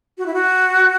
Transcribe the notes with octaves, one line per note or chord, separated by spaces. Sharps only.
F#4
E4
F#4